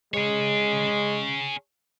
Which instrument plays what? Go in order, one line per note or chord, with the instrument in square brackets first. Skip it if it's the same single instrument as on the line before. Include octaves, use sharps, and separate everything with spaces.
[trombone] G#3 [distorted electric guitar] G#4 C#5